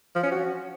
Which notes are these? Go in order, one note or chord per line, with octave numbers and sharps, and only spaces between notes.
F3
C#4
F#4